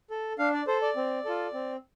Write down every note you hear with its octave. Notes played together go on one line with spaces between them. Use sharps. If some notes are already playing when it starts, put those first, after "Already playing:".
A4
D4 F5
D5
A4 C5
D5
C4
F4 A4
C4